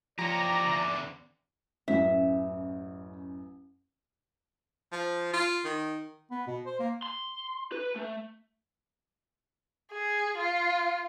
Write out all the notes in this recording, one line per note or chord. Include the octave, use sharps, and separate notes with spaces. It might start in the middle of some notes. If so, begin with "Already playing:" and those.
F3 G4 C#5 D5 A#5
E2 D3
A1 F#2 E5
F3
F4
D#3
B3
B2
C5
A#3
C6
B4
A3
G#4
F4